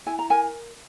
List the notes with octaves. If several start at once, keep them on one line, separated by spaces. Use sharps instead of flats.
E4 G#5
A#5
A#4 G#5